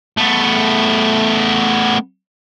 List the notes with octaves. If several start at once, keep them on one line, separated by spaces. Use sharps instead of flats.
A3 B3